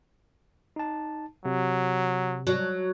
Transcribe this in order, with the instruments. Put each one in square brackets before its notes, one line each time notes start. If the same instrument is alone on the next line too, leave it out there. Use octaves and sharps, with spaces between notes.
[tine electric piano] D#4 A5
[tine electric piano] C3 [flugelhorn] F#3
[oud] F#3